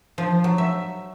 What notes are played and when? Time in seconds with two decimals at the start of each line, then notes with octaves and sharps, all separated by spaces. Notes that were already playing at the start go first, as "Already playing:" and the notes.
0.18 F3
0.44 F#3
0.58 E5